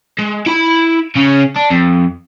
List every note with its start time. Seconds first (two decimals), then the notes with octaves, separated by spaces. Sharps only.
0.19 G#3
0.46 E4 B5
1.15 C#3 C#4
1.56 D4
1.71 F2